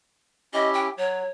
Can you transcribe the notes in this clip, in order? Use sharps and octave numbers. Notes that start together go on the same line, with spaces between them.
C#4 E4 G4 D#5
G5
F#3 C#5